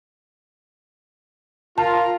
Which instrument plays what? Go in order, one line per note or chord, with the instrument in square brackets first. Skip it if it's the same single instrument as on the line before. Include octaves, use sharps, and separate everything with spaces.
[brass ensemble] F4 [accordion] A#4 A#5 [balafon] A5